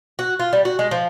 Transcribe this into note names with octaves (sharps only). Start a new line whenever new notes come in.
F#4
F4
G3
F#4
G#3
F3